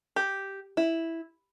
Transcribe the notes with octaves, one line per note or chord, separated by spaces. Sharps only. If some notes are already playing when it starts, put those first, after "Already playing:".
G4
E4